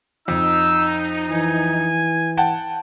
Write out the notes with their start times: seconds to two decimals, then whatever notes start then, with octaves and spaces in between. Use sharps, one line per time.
0.28 F2 D#4 E6
1.30 E3 G#5
2.37 F#5 G5 A5